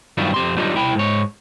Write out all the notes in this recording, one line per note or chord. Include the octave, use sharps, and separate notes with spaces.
G2 D#3 F#3 G3 E4 F4
F2 G4 C6
F#3 G3 D4 D#4 F4 G4
C2 E4 G5 A#5 B5
G#2 C#5